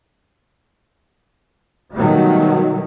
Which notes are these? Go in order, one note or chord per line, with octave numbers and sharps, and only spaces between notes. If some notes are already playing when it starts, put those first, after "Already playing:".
B2 D#3 F#3 G3 A3